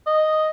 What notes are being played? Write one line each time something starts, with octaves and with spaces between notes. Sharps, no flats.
D#5